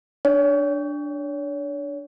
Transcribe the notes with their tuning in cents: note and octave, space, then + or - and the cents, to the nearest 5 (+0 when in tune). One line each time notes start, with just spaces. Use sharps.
D4 +0 C#5 +35